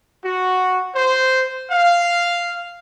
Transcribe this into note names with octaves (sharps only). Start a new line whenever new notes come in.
F#4
C5
F5